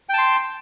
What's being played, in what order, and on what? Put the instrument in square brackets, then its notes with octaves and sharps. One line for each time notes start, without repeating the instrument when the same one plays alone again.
[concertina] G5
A5
C6